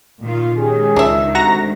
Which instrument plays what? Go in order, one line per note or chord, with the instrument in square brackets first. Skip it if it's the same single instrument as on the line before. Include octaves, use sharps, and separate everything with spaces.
[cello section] A#2 D#3 F4
[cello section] D#3 G#3 [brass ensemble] C#4 G4 G#4
[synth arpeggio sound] C#2 [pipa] D4 E5
[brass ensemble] D2 C3 [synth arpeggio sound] F#4 A#5 A#6